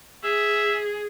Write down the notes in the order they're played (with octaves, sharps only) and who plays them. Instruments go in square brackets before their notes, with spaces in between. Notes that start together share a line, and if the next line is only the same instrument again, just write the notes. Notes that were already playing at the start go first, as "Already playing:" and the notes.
[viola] G#4 [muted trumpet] E5